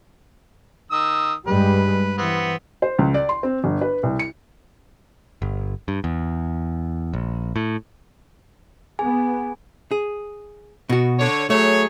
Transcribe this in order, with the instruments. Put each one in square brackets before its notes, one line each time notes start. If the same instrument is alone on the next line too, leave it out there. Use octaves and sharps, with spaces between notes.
[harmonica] D#3 D#6 E6
[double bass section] G2 G3 G#3 [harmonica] B4
[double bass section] E3 [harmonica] B3 C4 F#5
[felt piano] C5
C#2
D5
C6
C4
G1
B4
C2
C#7
[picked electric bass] G1
G2
E2
A#1
A2
[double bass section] B3 [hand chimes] G#4 G#5
[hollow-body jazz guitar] G#4
B2 F#4
[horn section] D3 C#5
[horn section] F#3 G#4 C#5 [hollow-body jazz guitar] A3